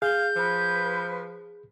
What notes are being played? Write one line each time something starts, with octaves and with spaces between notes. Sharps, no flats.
G#4 F5 G6
F3 B4